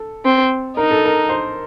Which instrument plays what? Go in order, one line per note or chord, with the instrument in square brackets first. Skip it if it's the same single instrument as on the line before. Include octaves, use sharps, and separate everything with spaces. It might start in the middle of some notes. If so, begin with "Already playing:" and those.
Already playing: [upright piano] A4
[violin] C4
[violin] D#4 [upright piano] A#4
[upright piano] A4
A#4
C5